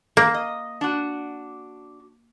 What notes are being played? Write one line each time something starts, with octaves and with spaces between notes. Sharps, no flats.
A#3
D#5
D4 F#4